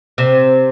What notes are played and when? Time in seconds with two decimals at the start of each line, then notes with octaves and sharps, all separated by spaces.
0.18 C3